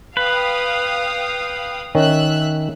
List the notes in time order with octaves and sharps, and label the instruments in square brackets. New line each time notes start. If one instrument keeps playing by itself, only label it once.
[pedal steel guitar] B4 [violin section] F5 G5 D#6
[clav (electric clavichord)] D#3 C#4 [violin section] E5 E6 F#6